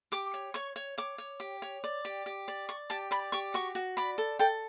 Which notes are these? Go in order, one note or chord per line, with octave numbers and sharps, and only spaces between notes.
G4 D6
C#5
C#5 C#6
C#5
C#5 D6
C#5
G4
C#5
D5
G4
G4
D5
D5 C#6
G4 A5
D5 B5
G4 C#6
F#4 C#6
F#4
D5 B5
A4
A4 G5